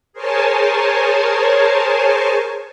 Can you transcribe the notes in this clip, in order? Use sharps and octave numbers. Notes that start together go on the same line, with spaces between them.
G#4 A#4 C5 C#5 G#5 A5